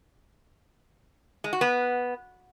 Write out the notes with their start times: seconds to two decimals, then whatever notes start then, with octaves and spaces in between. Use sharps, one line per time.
1.44 G#3
1.53 F#4
1.61 B3